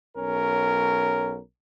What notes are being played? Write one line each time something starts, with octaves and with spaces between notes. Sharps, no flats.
B1 C#4 A#4